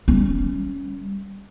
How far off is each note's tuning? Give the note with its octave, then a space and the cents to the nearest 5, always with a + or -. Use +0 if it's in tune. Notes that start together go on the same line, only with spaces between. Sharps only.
G3 +0 C#4 +0